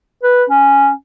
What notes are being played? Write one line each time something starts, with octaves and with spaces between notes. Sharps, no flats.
B4
C#4